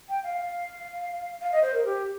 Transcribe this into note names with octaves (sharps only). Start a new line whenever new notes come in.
G5
F5
F5
F5
D#5
C5
A#4
G4